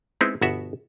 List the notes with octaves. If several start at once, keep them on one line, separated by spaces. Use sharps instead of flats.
G#3 B3 C4 D#4 E4 B4
G1 B2 B3 F#4 E5 F#5